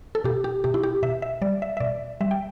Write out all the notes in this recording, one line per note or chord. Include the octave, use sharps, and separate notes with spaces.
A4
B2 G4
G4
B2 G4
E4
G4
B2 E5
E5
G3 D5
E5
E5
B2 D5
G3 E5
G5